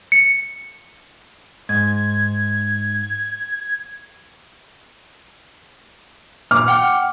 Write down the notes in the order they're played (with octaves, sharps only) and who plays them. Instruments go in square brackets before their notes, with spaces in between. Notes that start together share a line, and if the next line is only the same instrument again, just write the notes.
[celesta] C#7
[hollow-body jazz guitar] G#2 [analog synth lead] G#6
[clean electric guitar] A#2 [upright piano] D6 F6
[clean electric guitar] F#5 G5